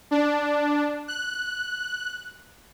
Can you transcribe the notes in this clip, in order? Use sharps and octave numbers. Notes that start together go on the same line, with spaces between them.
D4
F#6